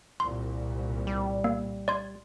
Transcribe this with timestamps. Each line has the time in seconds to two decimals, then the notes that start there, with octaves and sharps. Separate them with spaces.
0.20 C2 A#2 C6
1.07 G3
1.44 A#3
1.88 D5 C6 G#6